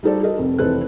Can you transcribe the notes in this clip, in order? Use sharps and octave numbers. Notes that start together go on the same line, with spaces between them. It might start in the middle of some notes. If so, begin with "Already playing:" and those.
G3 D#4 F#4 A4 C5 D5
F#4 A4 A#4 D#5
F1 F2
F1 E3 C4 A4 B4 F#6